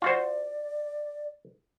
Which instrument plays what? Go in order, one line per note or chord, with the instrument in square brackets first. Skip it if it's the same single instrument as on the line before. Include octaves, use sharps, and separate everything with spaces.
[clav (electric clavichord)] F4 F#4 C5 [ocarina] D5